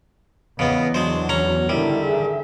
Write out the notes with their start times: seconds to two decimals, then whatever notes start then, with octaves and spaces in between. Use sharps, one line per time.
0.59 E2 C#3 B3 B4 D#5
0.94 F#3 G#3 D4 F#4 C5
1.29 C#4 A#5
1.69 D3 D#3 G3 E4 E5
2.04 G#4